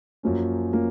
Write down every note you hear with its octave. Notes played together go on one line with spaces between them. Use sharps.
F#2 F3 A#3 C#4
F3 A#3 C#4